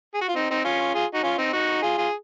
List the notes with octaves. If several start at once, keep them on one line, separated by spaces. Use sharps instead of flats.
G#4
F#4
F4
C4 D#4
C4 D#4
C#4 F4
F4 G#4
D#4 F#4
C#4 F4
C4 D#4
D#4 F#4
F4 G#4
F4 G#4